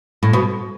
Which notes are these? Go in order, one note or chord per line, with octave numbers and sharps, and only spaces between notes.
A2
B2